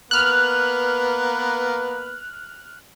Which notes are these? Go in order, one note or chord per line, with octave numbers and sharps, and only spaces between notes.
A#3 B3 B4 F6 F#6